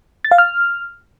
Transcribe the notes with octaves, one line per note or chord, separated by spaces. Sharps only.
A6
F5
F6